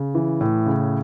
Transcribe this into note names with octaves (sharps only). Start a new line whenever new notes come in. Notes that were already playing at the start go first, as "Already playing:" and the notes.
Already playing: C#3
E3
A2
C#3